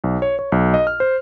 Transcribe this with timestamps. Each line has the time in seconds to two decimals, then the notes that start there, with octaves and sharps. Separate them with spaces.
0.04 B1
0.22 C#5
0.39 C#5
0.52 B1
0.74 D#5
0.87 F6
1.00 C5